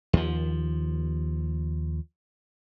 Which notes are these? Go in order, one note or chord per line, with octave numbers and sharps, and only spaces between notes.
D#2 F3